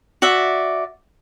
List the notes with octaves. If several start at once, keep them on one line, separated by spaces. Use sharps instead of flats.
F#4 D5 E5